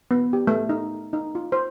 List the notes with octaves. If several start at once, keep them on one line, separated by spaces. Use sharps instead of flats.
B3
G4
A3
D#4
D#4
F4
C5